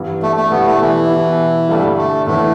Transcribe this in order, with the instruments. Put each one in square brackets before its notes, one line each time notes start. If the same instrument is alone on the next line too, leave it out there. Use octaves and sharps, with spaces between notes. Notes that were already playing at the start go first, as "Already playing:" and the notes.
Already playing: [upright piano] G2 E3 B3
[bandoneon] A3
A3
[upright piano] B2 G3 E4 [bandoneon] B3
[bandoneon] A3
E3
[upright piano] B2 B3 E4 G4
[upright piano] G2 D3 A3 [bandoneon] G3
[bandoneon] A3
[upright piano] A2 E3 B3 E4 [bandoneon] A3